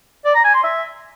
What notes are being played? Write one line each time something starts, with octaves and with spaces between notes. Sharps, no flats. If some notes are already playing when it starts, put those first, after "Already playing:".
D5
A#5
G#5
C6
E5